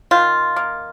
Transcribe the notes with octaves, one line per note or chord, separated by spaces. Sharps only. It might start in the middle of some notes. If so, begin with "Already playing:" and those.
D#3 F4
A#3